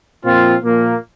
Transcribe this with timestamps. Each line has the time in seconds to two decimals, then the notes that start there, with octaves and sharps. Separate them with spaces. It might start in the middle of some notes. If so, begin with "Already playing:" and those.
0.24 A#2 F3 C4 F4
0.64 A#2 F3 A#3